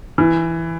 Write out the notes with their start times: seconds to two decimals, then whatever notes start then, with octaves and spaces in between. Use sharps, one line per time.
0.18 E3